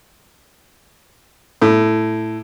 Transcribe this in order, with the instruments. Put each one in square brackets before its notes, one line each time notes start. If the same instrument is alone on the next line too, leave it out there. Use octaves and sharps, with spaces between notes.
[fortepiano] A2